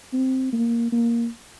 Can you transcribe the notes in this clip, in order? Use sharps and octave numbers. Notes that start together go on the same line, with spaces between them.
C4
A#3
A#3